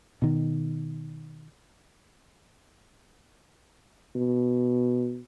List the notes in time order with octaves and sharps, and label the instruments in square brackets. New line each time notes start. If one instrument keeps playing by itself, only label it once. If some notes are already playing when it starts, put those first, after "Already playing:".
[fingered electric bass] B2 D#3
[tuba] B2